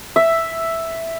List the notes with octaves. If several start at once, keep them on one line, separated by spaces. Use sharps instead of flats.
E5